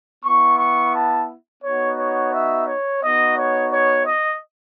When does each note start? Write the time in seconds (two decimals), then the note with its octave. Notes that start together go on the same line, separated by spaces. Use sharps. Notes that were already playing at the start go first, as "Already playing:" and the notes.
0.25 B3 E4 C#6
0.59 C#6
0.94 A5
1.63 B3 D#4 F#4 C#5
1.98 C#5
2.34 E5
2.68 C#5
3.03 B3 D#4 F#4 D#5
3.38 C#5
3.72 C#5
4.07 D#5